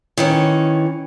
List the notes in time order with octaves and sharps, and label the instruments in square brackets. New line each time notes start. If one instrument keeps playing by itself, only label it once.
[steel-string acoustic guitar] D#3 E3 C#4